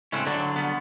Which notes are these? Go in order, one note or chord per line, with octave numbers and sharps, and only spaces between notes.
A2 C#3 G#3 C4 C#4
D3 F#3 D5
G3 B3